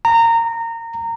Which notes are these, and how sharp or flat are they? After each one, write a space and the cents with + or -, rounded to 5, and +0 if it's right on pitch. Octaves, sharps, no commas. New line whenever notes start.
A#5 -20